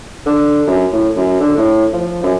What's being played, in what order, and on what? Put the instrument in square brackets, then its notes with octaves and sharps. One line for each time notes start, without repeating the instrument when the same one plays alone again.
[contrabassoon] D3
F#2
A2
F#2
D3
A2
F3
F#2